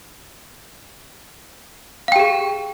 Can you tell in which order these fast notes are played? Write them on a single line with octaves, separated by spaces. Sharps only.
F5 G5 G4 G#4